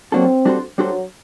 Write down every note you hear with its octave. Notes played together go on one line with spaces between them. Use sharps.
F#3 A#3 C4 D4 F#4 A4
G3 D4 F#4 A4 C5
F#3 G3 D4 F#4 A4 C5